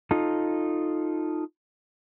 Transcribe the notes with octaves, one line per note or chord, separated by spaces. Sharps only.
D#4 F4 A4